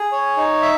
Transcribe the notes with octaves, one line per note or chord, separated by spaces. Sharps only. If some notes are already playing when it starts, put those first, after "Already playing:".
Already playing: G#4
C#5
D#4
E5